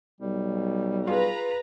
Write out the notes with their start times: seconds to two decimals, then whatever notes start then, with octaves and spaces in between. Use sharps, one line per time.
0.21 B1 G3
1.07 F4 G#4 B4 A#5